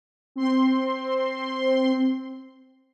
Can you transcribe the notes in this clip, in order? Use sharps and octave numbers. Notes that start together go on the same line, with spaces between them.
C4 C6